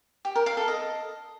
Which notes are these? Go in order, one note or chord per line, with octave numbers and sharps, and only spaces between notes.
G4
A#4
F5
A4
D#5